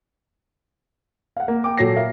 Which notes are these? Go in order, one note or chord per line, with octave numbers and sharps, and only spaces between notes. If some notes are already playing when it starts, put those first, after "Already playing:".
F5 F#5
A#3
G5 D6
A#2 F#3 A4 C#5 A#6 C7
A#4 E5 F5